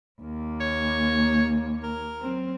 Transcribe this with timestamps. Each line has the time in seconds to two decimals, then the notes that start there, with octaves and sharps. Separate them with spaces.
0.21 D#2 A#3
0.61 C#5
1.84 A#4
2.21 F#3 C4